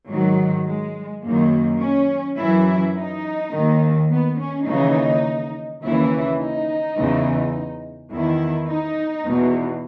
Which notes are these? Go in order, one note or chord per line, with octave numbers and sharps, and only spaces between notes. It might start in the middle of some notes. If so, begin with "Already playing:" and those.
G#2 D#3 F#3
G#3
F#2 D#3 A#3
C#4
F#2 E3 E4
D#4
D#2 D#3
B3
C#4
D#2 C#3 E3 D#4
D#2 C#3 E3 E4
D#4
E2 C#3 E3
E2 D#3 E4
D#4
E2 B2